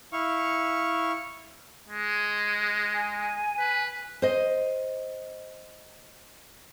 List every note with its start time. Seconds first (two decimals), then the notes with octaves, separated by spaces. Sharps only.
0.13 E4 F5 C#6
1.88 G#3
2.94 G#5
3.60 B4
4.22 C5 D#5